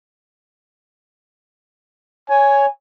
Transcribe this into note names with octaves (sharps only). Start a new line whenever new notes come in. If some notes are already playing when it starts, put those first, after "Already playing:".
C#5 G#5